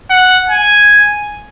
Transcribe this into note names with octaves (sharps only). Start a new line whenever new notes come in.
F#5
G#5